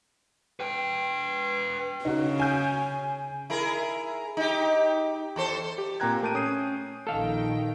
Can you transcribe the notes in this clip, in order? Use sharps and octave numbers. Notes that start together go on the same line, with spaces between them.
B4 G5
C#3 D#4 F#4
G#5 G6
E4 G#4 A#4
D#4 G4
E2 A4 C5
G4
A#2 C4 G5 A#5 F#6 G#6
A3 A#4 A5 G6 D7 D#7
C#4 D#6 G6 C7 D#7
A#1 D#3 A4 F5 G5